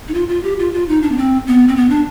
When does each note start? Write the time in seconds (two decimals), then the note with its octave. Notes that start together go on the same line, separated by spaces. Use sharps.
0.08 D#4
0.14 F4
0.29 F4
0.43 G4
0.59 F4
0.74 F4
0.88 D#4
1.02 D4
1.11 B3
1.17 C4
1.47 B3
1.68 C4
1.76 B3
1.90 D4